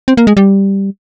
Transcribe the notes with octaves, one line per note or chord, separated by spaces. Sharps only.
C4
A#3
G#3
G3